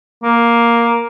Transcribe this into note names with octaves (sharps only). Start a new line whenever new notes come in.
A#3